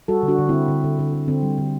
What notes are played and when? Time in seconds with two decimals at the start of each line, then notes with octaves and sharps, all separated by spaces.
0.08 G3 F#4 A4
0.23 D3
0.28 D4 F#4
0.38 D3
0.49 D3 C4 E4
0.68 D3
0.84 D3
0.99 D3
1.13 D3
1.28 D3 C4
1.43 G3
1.58 D3